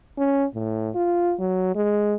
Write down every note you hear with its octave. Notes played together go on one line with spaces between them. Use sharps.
C#4
A2
F4
F#3
G#3